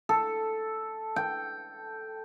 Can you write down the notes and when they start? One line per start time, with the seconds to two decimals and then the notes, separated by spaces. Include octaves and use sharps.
0.09 A4
1.16 G5